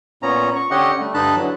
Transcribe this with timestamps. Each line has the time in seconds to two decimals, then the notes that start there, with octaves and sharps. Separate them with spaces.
0.23 A#2 B3 C#4 A#5
0.56 C#6
0.71 D3 C#4 G4 D#5 F#5
1.00 G3 A3
1.14 G2 D3 D#4 A5 B5 F#6
1.36 D3 E3 F#3